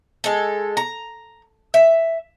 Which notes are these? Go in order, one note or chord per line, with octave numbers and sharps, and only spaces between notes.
G#3 A4
A#5
E5